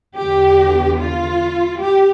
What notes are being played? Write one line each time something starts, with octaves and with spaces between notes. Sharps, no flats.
E2 D3 G4
F4
G4